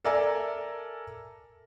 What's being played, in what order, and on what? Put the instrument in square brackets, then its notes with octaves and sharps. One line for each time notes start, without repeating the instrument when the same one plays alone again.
[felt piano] A4 A#4 D5 E5 G#5 A#5